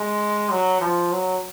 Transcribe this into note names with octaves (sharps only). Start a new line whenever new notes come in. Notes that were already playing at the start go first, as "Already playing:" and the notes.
Already playing: G#3
F#3
F3
F#3